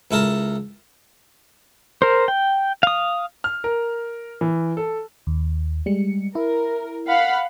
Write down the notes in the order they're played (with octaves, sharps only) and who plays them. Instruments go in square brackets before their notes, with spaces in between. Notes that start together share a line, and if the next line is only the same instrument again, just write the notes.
[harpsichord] C#2 E4 A4 A#4 A5
[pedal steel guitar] A#4 C5
G5
F5 D#6
[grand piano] F6
A#4
E3
A4
[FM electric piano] D#2
G3 G#3 C#7
[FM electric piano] E4 [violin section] A#4
[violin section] F5 F#5 B5